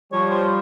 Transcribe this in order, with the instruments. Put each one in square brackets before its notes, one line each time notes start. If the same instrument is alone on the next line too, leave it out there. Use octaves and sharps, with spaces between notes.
[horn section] F3 G3 [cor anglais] C#5
[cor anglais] C5